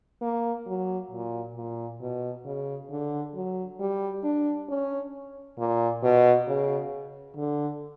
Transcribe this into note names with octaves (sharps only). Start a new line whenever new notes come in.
A#3
F#3
A#2
A#2
B2
C#3
D3
F#3
G3
D4
C#4
A#2
B2
C#3
D3